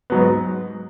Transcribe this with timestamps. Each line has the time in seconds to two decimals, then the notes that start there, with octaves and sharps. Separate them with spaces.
0.10 G#2 F#3 B3